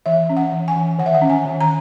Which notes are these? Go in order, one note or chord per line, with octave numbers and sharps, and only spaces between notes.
E3 E5
C#4
F#5
E3
G#5
E3
D#3 F#5
E5
F#5
C#4
G#5
D#3
A#5